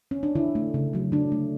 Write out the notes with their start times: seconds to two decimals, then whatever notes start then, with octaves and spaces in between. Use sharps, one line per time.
0.11 C#4
0.23 D4
0.35 D3 E4
0.55 A3
0.74 C#3
0.93 F#3 A3
1.12 D3 D4
1.32 A3